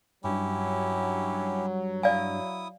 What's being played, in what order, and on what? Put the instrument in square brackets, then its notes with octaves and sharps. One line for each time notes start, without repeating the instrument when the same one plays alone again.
[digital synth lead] G2 [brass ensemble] F#3 [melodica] C#4 E4 G4
[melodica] E4 D#6 [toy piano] D5 F5 G#5